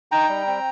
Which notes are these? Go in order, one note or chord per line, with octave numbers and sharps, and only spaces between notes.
D#4 G5 A#5
G3
C4